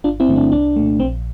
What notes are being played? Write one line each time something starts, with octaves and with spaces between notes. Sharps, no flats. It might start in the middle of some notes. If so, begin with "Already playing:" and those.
G1 D4 F4
C4 E4
G2 D3 A3
D4
C2 D4
A#2 A3
A#1 C4